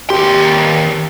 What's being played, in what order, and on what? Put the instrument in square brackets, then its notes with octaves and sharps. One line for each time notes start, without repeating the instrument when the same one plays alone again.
[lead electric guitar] D#2 C6 [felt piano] G4